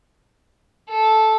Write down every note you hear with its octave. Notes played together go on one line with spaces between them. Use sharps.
A4